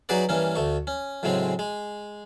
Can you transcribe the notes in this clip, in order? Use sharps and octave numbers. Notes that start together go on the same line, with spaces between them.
F#3 D#4 F#4 G#4 B4 D5
G2 E3 A#3 C#4
D2 A3 C#6
C#4
F#2 A2 C#3 G#3 C4
G#3